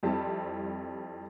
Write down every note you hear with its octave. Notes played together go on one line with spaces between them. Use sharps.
F2 G3 C4 E4 A5